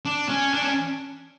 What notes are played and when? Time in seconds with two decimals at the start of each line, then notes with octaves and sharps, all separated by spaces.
0.05 D4
0.29 C#4
0.54 D4
0.62 C#4